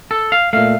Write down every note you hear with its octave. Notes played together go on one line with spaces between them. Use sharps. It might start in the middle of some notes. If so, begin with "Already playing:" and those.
A4
F5
A#2 A3 F5